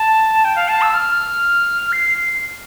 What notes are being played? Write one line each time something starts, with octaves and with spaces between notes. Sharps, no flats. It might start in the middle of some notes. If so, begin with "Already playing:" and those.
Already playing: A5
G5
F5
A5
E6
F6
C7
C7